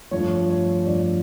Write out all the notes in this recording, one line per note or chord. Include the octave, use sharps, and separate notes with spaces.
G2 F3 A3 C#5
C#5
G2 F3 A3 D5